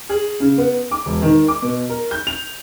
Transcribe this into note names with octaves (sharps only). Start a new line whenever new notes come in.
G#4
C#3
B3
D6
E1
D#3
D6
B2
A#4
G6
F7